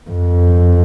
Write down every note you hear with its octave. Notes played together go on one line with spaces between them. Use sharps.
F2